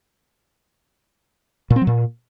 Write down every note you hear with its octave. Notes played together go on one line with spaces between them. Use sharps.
A#2
C4
F#3
A#2